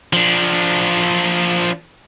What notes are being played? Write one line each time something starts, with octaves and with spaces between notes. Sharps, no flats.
F3 D4